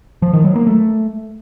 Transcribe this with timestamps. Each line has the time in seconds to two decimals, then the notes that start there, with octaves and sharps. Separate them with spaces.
0.22 F3
0.33 D#3
0.44 F#3
0.56 A#3
0.67 A3